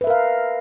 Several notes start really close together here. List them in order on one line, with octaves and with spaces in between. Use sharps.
B4 E5 A#4 F5